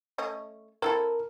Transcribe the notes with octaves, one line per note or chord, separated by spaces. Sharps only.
A3 C#4 D#5
C4 E4 A4 A#4